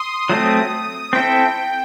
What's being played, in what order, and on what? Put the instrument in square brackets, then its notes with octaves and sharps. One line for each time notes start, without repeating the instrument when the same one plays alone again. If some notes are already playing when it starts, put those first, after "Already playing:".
Already playing: [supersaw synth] C6 D#6
[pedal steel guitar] F#3 A3 C4 [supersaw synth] D#6
[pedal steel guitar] C4 E4 A4 [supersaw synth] G5